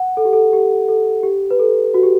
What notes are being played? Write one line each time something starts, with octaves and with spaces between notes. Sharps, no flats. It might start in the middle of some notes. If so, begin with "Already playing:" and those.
Already playing: F#5
A4
G4
A4
G4
A4
G4
B4
A4
F#4
G4